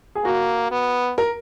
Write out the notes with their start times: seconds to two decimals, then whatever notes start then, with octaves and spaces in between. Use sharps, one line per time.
0.15 G#4
0.25 A#3 F#4
0.71 B3
1.18 A#4